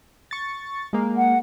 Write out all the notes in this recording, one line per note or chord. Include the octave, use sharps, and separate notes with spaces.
C#6 A6
G#3 A#3
F#5